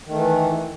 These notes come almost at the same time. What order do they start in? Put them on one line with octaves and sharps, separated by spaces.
D#3 A3 E3